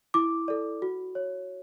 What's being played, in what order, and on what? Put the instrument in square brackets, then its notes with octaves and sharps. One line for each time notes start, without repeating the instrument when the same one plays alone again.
[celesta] E4 D6
A4 D5
F#4
C#5